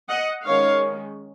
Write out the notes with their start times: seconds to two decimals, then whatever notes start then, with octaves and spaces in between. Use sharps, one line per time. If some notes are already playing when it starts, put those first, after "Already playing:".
0.09 D#5 F#5
0.45 D#3 G#3 C#4 C#5 F5